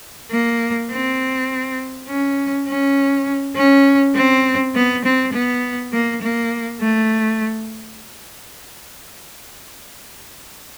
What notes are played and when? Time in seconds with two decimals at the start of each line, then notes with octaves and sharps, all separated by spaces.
0.31 A#3
0.91 C4
2.08 C#4
2.67 C#4
3.56 C#4
4.15 C4
4.75 B3
5.04 C4
5.33 B3
5.93 A#3
6.22 A#3
6.81 A3